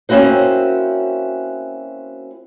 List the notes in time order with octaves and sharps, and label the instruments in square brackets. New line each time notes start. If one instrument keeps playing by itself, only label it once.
[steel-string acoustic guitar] A#3 C4 C#4 E4 F#4 C5